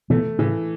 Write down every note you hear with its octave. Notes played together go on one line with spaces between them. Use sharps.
B2 E3 A3
A2 C#3 E3